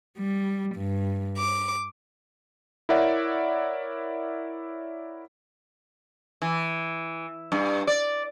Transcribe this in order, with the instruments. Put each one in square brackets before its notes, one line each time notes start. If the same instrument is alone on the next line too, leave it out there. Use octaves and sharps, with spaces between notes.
[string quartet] G3
G2
D6
[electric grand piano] E4 A#4 C#5 D5 E5 F#5
[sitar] E3
G2
D5